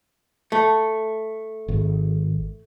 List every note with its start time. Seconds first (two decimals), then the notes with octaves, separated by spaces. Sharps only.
0.52 A3
1.68 G#1